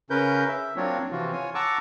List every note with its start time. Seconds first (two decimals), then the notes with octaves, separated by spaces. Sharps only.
0.10 C#3 C#4 A#4 B4 G6
0.48 E5
0.77 F#3 A#3 C4 D4 F4 C#5
1.12 C3 E3 F3 F4 F#4
1.33 F4 C#5 G#5
1.55 F#5 A5 A#5 C#6 D6 E6